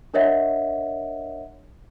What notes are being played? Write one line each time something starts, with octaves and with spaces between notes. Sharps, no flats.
D4 A#4 C#5 D#5 E5 F#5